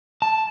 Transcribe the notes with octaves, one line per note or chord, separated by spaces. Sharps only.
A5